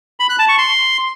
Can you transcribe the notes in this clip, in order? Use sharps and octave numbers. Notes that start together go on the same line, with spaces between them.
B5
F#6
A5
C#6
C6